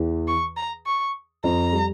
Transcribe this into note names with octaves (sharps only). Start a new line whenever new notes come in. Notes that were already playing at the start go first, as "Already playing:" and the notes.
Already playing: E2 E3
C#6
A#5
C#6
F2 F3 A#5
G3